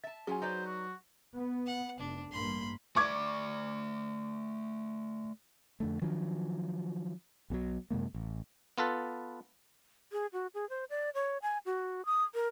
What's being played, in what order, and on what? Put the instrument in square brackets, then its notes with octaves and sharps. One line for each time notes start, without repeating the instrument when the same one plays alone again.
[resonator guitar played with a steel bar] E5 A5 [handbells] A6
[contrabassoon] F#3 [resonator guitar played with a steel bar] C#4 F4 [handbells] G#4 G#5
[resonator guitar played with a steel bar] D#4 B4 D5 [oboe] C5
[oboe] F#4
[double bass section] B3
[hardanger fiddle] F#5
[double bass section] F1 [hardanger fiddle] D4
[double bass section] A1 G2 A#3 [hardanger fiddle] B5 C6
[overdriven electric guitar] A3 D5 [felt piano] C#6 D6 G#6
[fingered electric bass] F2 D3 A3
D#3 F3 F#3 D4
B1 B2 F3 F#3
F#2 C3 G#3 A#3
A1
[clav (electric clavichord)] B3 F4 A4 B4
[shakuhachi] G#4
F#4
G#4
C5
D5
C#5
G#5
F#4
D#6
A#4